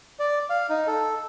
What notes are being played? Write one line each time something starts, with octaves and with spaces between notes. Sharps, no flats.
D5
F5
D#4
A4